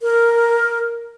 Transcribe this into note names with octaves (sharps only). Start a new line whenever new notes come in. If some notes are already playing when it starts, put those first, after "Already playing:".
A#4